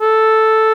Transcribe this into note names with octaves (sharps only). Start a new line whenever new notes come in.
A4